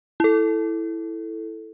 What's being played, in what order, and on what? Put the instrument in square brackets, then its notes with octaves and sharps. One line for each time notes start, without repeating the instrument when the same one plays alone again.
[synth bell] E4 A4